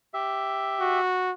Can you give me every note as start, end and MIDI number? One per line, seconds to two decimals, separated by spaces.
0.14 1.00 67
0.14 1.00 76
0.81 1.32 66